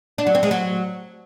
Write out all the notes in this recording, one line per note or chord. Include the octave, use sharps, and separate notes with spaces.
D4
F#3
C4
G#3
F#3